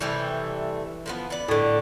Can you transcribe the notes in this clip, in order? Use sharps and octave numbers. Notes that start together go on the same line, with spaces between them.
C3 E3 G3 A3
D3 F3 B3
B3 D5
A2 D3